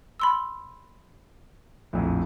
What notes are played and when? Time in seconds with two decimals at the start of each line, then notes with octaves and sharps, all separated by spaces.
0.20 B5 C6 E6
1.93 A#1 F2 A2